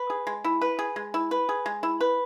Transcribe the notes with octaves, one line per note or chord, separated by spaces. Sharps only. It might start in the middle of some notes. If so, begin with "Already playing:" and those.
Already playing: B4
G#4
G#3
E4
B4
G#4
G#3
E4
B4
G#4
G#3
E4
B4